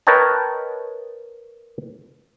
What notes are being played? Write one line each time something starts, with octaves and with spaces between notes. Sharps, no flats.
A#4 B4 C#5 D#5 G5 A5